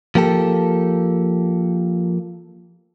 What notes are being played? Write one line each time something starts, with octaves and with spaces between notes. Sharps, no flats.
F3 A#3 G4 A4